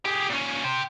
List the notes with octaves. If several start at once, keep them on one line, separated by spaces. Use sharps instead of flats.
G4 G#4
A#2 C#4
G4 C5